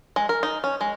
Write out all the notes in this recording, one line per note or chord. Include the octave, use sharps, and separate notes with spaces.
G#3
A#4
D#4
C#4
G#3